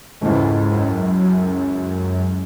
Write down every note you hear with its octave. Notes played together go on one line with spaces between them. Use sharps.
C#2 G#2 C#3 E3 A3
F#2
F#2